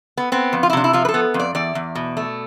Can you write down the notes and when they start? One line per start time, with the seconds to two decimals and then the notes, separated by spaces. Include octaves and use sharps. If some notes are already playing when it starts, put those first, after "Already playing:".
0.17 B3
0.32 B3 C4
0.53 F2
0.63 F4
0.70 E4
0.73 C3 D4
0.84 E4
0.93 F3 F4
1.05 B4
1.09 A4
1.14 B3
1.34 F2
1.40 D5
1.55 E2 D5
1.75 E2
1.95 B2
2.17 A3